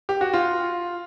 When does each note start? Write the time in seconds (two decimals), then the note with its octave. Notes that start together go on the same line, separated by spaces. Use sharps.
0.09 G4
0.21 F#4
0.34 F4